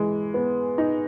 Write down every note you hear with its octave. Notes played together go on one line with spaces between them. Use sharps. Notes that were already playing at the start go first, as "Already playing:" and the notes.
Already playing: E3 G#3
B3
D#4